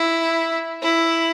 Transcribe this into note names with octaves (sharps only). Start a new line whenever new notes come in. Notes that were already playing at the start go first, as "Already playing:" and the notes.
Already playing: E4
E4